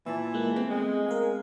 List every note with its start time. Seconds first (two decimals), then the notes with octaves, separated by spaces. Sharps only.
0.06 A#2 E3 E5 A5
0.34 G#3 A#3 F#6
0.56 A3 B3 C4
0.70 G#3
1.06 A#4 F5 G#5